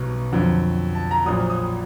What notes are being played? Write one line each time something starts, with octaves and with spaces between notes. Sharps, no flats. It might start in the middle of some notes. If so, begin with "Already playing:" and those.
Already playing: B1 B2 G3 C#6
F2 D3 F#3
A5
A#5
A#1 A#2 F#3 D#6
D#6